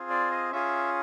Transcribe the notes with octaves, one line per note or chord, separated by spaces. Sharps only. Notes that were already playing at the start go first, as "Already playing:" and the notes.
Already playing: C4 F4 G#4
D5
D#5
C#4 F4 G#4 E5